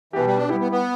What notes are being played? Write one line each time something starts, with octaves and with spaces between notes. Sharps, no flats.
B2 E3 B3 G4
G3
D4
G3 B3 E4 G4
B3
B3